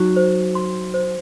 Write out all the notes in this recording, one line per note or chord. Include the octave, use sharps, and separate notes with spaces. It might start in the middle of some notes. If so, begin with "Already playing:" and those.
Already playing: F#3 D#4
C5
C6
C5